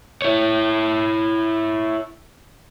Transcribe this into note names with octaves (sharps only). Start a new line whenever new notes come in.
E4 C#5